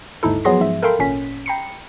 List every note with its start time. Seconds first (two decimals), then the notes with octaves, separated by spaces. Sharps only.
0.23 G1 D#2 G#2 D#4 E4 A4
0.45 F3 F#3 B3 G#4 C6 A#6
0.60 G#2 F3 E5
0.82 A4 A#4 F5 G5 B5 C6
0.99 G#1 A#2 C#4 B6
1.46 G5 A#5 B5 C7 C#7